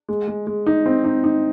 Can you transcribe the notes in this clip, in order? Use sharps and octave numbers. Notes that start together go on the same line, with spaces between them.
G#3
G#3
G#3
D#4
C4
D#4
D#4